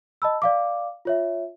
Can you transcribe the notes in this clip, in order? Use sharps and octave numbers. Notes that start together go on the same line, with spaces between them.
D#5 A5 B5 E6
D5 F5 D6
F4 C#5 E5